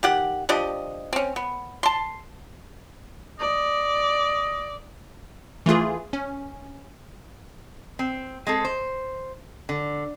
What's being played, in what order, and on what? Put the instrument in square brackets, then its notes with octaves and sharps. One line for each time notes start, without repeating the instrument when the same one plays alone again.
[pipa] D#3 G4 F#5
F3 D4 G4 D#5
C4 C#4
B3
A5 C6
[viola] D5 [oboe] D#5
[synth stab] E3 A3 F4 G#4
C#4
[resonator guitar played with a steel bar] C4
G#3 C4 A4
C5
D3